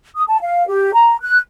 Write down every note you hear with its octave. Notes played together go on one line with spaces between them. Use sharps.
D#6
A5
F5
G4
A#5
F#6